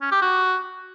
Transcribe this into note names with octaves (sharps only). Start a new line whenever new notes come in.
C#4
G4
F#4